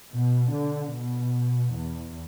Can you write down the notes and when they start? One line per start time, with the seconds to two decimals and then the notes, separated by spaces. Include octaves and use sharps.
0.13 B2
0.53 D3
0.94 B2
1.74 E2